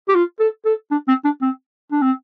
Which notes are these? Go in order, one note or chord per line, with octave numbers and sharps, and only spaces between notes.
G4
F4
A4
A4
D4
C4
D4
C4
D4
C4